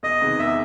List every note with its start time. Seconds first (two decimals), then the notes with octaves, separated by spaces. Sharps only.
0.03 E2 D#5
0.21 C3 D#3 G#3 B3
0.39 E2 E5